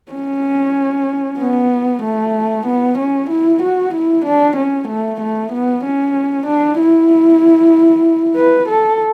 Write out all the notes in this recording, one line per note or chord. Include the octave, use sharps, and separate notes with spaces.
C#4
B3
A3
B3
C#4
E4
F#4
E4
D4
C#4
A3
A3
B3
C#4
D4
E4
B4
A4